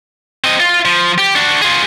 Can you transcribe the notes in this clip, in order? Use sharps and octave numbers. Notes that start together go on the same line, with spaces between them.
C4 D#5
F4
F3
G4
D4 F#4
F4 G#4